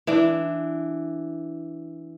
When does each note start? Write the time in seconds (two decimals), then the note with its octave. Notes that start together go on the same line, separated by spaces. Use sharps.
0.07 E3 D4